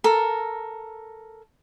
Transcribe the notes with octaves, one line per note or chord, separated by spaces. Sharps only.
A4 A#4